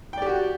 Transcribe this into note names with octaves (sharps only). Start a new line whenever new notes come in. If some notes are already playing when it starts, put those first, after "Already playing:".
F#4 G4 D5 G5